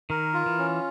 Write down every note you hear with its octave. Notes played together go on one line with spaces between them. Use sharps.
D#3 A#4
F4
E3
C#4